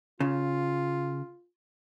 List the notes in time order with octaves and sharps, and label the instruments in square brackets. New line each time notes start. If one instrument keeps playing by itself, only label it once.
[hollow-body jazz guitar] C#3 [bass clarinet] F4